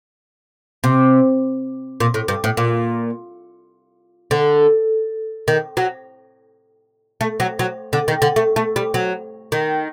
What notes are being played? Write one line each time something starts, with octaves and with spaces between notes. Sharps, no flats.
C3
A#2
A2
G2
A2
A#2
D3
D#3
F#3
A3
F#3
F#3
D3
D#3
D3
A3
A3
G3
F#3
D#3